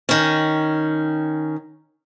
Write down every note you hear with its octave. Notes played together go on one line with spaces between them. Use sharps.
D#3 C#4